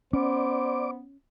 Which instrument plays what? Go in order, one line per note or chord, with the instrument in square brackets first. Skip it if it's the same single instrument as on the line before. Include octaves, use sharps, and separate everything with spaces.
[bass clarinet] B3 [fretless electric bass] C#4 [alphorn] C5 [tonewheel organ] D5 D6